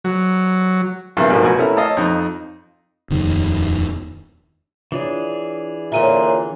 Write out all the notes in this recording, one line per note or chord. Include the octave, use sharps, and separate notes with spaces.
F#3
E2 G2 C3 D#3 E3
A1 G#2 B2 D#3 F3
C2 B2 F#4 B4 G#5
A3 C#4 E4 A#4
C#5 D#5 F5 A5 E6
F2 D#4
D#1 F2 D#3
E3 D4 F4 G#4 C#5
A#2 D3 C4 C#4 E5 A#5 D#7